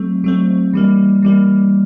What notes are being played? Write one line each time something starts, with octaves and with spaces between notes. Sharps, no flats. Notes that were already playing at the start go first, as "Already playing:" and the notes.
Already playing: F#3 A3 C4
F#3 A3 C4
E3 G3 A#3
E3 G3 A#3